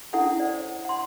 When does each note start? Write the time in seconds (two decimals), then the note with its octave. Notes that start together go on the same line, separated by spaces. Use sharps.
0.13 C#4 D4 E4 A4 F#5
0.40 C5 D5
0.85 F#5 C6